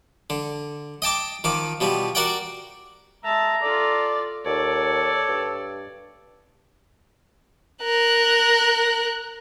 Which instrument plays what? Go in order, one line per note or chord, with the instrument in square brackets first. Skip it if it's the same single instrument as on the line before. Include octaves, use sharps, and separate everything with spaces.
[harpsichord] D3
D#5 G5 A5 D6
D#3 F3 D6
B2 F3 G3
F#4 A#4 D5 F#5 G5
[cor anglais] G#3 [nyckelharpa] E5 A5 [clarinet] A#5
[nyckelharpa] F4 A4 [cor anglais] D5
[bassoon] D#2 [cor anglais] A4 [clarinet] C#5 [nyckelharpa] D5
[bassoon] G2
[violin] A#4 F#6